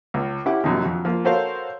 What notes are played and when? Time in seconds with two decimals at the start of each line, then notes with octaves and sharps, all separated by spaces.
0.14 C#2
0.45 C#4 E4 G4 E5 F#5 D6
0.64 A#1 F#2 C3 D#3
0.81 F2 F#3
1.05 F3 A#3
1.25 F#4 A4 A#4 C5 C#5 F5